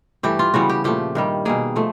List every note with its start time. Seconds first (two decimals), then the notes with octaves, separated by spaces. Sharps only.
0.23 G2 E3 A3 G4
0.39 F4
0.54 C#3 E3 G3 B3 F#4
0.69 G4
0.84 A#2 F3 A3 G4
1.15 G2 D#3 G3
1.45 B2 G3 A#3 G#4
1.76 F3 A3